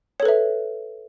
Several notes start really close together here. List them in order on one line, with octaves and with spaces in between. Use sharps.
C#5 A4 B4 E5